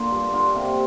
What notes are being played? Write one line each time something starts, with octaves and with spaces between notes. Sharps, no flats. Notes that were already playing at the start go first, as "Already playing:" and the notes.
Already playing: A#2 D3 A#3 D4 F4
G2
D3 A#3 F4
C3